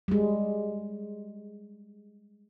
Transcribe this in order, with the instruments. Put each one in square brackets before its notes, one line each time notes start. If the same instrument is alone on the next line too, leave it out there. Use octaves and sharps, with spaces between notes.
[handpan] G3 G#3